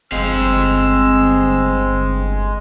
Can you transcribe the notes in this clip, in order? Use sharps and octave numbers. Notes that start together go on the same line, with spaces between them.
G1 G#3 C4 F5 E6